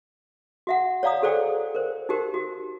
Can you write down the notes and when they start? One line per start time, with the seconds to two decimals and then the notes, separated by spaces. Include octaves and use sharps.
0.67 F#4 E5 F#5
1.03 C#5 D5 F5 A#5 D#6
1.22 F#4 G#4 A4 C5 D5 G5
1.75 A#4 C5
2.09 D#4 F#4 G4 A#4 C5
2.34 F#4